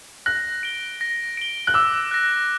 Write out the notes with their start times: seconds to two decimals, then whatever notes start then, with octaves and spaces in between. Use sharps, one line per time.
0.26 F#6 A#6
0.63 D7 G7
1.01 A#6
1.37 D7 G7
1.67 F#6
1.74 D6 E6
2.11 F#6 A#6